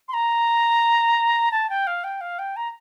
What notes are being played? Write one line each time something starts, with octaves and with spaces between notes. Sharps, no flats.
C6
A#5
A5
G5
F5
G5
F5
G5
A#5